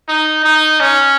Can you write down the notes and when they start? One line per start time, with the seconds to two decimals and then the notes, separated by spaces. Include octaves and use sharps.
0.08 D#4
0.44 D#4
0.80 C#4